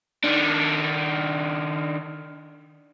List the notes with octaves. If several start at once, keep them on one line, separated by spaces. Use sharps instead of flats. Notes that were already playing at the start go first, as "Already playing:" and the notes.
D#3 D4